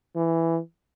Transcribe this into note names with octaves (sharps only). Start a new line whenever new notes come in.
E3